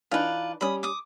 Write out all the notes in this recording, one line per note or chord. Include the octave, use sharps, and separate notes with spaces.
E3 D4 D#4 F4 B4
G3 C#4 B5 D#6
D6 D#6